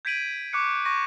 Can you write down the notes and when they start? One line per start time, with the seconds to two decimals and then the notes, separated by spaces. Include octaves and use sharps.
0.05 G6 G#6 B6 D7 D#7 F#7
0.53 C#6 D6 F#6 C#7
0.85 C#6 A#6 D#7